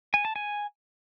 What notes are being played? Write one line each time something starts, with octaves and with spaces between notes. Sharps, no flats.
G#5
A5
G#5